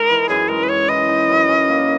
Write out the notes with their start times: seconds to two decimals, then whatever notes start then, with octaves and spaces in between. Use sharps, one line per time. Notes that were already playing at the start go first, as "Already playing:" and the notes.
Already playing: G#3 D#4 A#4
0.09 E3
0.29 F#2 G#4
0.48 G#3 A#4
0.63 B4
0.68 F#2 C#5
0.88 E3 D#5
1.09 D#4
1.29 F#2
1.48 C#4
1.69 A#3